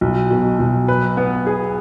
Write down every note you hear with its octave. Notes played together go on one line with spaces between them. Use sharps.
B1
B2
B1
B4
B3
G#4